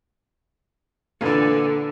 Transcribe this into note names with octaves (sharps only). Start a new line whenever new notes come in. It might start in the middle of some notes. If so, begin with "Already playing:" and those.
A#2 D3 E3